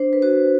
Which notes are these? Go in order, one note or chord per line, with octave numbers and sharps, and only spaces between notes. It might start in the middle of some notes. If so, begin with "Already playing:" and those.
Already playing: D4 C5
B4
F#4 C5